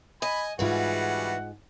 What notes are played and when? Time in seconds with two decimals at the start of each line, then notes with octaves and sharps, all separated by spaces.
0.22 D#5 G#5 B5
0.59 G#2 E3 G3 F4 F#4 G#4 B4 F#5